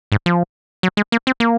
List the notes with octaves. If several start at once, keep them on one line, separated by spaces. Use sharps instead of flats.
G#2
F3
F#3
G#3
A#3
C4
A#3